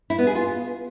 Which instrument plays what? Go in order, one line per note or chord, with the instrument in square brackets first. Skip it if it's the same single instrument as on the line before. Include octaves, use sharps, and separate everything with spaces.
[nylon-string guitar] E4
B3
G#4
F4